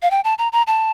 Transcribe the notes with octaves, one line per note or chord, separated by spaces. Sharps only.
F5
G5
A5
A#5
A#5
A5